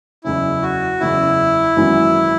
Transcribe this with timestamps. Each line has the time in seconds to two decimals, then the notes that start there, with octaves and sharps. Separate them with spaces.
0.24 F#1 E2 C#3 E4
0.62 F#4
1.00 F#1 E2 C#3 E4
1.77 G#1 F#2 E3 B3